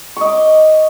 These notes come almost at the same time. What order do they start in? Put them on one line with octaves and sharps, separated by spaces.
C#6 D#5 D6